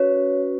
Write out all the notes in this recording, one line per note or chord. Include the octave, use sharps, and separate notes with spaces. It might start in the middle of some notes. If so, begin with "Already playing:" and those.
Already playing: C#4 F#4 B4 C#5